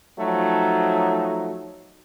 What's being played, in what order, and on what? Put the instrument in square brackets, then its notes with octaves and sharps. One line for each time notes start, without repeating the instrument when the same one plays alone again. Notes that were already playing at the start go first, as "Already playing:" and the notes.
[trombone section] F3 F#3 A3 D#4